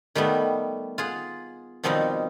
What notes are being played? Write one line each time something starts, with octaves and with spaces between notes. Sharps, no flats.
D#3 G3 A3 B3
F4 G#4 F#5
B2 D#3 F3 G3 C4 D#4